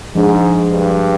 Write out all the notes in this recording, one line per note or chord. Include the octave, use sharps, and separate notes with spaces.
G#2 F3 G#3 D4 G#4
G2